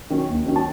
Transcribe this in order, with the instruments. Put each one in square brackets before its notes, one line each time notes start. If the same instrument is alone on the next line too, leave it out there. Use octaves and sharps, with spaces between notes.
[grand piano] D#3 F#3 C#4
D#2
D#3 F#3 C#4
A5